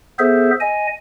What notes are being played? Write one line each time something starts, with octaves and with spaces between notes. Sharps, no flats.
B3 G#4 A4 C5 E5
D#5 G#5